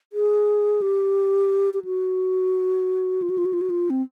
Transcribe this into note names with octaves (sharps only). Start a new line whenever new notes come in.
G#4
G4
G4
F#4
F4
F#4
F4
F#4
F4
F#4
F4
C4